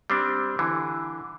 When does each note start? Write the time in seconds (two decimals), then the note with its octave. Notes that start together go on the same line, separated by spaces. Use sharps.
0.10 G3 C4 D4
0.59 D3 E3